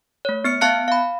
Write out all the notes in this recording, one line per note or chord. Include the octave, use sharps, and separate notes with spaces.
A3 C#5
B3 F6 C#7
B3 E5 F5 A5 F#6 C#7
F5 B5